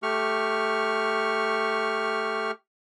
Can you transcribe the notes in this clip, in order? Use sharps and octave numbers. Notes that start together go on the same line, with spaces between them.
A3 G4 C#6 F6